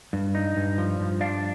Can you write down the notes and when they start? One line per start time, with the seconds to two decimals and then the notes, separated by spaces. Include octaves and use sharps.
0.13 G2
0.35 D#4
0.57 G2
0.78 F3
1.00 G2
1.21 D4 D5 F5